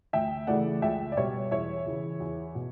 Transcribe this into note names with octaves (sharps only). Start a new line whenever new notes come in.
D2 E5 G5
C#3 E3 A3 D5 F#5
C#2 E5 G5
D5
B2 G3 C#5 E5
E2 C#5 E5
C#3 E3
E2
B2